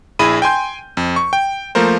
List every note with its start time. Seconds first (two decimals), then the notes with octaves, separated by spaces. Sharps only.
0.19 A#1 E4 G#4 B5 D#7
0.42 G5 G#5 C6 G6
0.97 F2
1.16 C#6
1.33 G5
1.75 F3 A3 A#3 A#4 C5